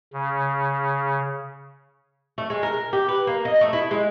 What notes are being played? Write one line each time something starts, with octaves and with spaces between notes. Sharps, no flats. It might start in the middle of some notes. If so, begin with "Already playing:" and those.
C#3
A3
G#3
A#4
G4
B4
A#3
D#5
A3
E4
G#3